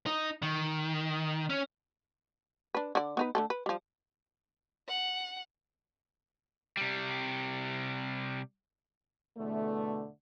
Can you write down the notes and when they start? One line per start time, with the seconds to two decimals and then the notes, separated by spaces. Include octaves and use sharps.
0.06 D#4
0.43 D#3
1.50 C#4
2.75 D4 B4
2.95 D3 D5
3.17 B3 D#4 B4
3.35 D3 A3 A4
3.50 B4
3.66 F3 G3
4.88 F#5
6.77 C3 G3
9.38 E2 B2 D3 A3